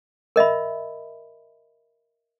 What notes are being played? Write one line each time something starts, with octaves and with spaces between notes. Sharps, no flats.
A#4 D#5 E5 B5